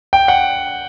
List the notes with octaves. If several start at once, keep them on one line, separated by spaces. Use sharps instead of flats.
G5
F#5